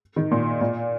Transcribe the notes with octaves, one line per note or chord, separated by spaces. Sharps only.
D#3
A#2
A#2